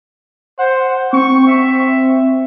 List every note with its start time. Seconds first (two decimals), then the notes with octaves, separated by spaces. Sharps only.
0.59 C5 F#5
1.13 C4 C#6
1.47 E5